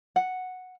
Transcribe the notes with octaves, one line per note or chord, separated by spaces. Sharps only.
F#5